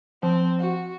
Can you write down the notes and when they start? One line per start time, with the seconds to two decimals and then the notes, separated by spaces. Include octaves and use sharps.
0.23 F3 C4
0.59 F#4